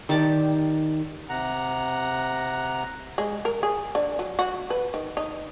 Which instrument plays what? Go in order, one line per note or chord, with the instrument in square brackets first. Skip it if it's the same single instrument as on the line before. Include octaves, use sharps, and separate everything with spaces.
[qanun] D#3 G4 D5 A5
[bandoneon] C3 F#5 A#5
[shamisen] G#3
A#4
G#4
D3
F#3
F#4
B4
D#3
D#4